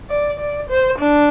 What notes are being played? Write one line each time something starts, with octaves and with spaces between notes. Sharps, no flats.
D5
D5
C5
D4